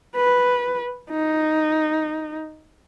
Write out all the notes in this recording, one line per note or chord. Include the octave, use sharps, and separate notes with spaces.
B4
D#4